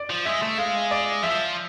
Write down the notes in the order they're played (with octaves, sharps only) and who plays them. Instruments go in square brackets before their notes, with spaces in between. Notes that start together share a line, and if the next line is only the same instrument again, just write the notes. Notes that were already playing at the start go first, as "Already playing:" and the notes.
Already playing: [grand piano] D5
[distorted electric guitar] F3
[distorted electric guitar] G#3 [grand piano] E5
[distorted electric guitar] A3
[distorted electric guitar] G#3 [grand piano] F5
[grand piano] D5
[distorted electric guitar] F3 [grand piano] E5